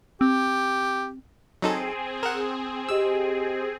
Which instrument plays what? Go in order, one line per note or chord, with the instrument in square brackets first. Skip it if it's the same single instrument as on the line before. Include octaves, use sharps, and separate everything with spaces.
[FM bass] C4 [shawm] G4
[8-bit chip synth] F#3 D#4 A4 [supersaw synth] C4 G#4
[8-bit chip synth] A#4 F#5 [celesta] E7
[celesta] F#4 G4 D#5 [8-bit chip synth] E6